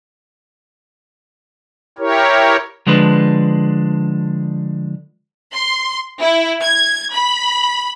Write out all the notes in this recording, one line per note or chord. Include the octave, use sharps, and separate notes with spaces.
E4 G4 A#4 C#5
D3 F3 G#3 D4 B4
C6
E4
G#6
B5